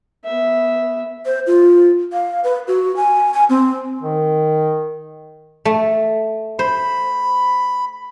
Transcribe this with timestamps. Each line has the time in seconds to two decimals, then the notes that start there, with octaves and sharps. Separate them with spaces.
0.25 B3 E5
1.26 C5
1.47 F4
2.13 F5
2.44 B4
2.68 F#4
2.96 G#5
3.34 G#5
3.49 C4
4.03 D#3
5.65 A3
6.59 C5 B5